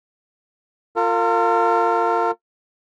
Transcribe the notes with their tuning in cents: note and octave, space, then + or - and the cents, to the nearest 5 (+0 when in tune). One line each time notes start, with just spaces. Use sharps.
F4 +0 A#4 -40